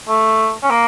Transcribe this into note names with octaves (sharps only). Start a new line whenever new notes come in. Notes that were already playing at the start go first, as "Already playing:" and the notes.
A3
C#4
A#3